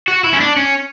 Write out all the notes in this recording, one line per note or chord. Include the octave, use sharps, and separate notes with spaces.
F#4
E4
C#4
D4
C#4